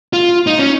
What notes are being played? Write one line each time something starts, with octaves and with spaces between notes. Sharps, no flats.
F4
D#4
C#4